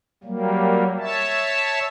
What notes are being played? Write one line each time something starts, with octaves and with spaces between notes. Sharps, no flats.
F#3 G3 A#3
C#5 E5 A5